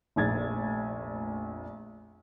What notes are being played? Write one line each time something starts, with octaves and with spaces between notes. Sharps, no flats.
F1 A#1 G#6 A6